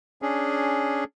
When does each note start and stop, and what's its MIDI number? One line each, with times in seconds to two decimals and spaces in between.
0.22 1.04 61
0.22 1.04 62
0.22 1.04 68